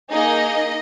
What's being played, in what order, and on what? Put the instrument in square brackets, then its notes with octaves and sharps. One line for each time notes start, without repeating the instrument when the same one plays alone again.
[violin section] A#3 D#4 G#4 D#5